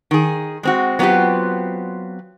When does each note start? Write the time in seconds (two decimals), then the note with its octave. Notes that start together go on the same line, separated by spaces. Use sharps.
0.11 D#3 G#4
0.63 G#3 C4 F#4
0.99 F#3 B3 C4 E4 F4 G4